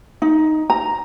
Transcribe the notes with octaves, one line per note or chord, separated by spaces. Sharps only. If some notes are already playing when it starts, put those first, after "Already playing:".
D#4
A#5